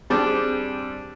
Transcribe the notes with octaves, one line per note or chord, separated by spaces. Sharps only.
G3 C4 D4 G#4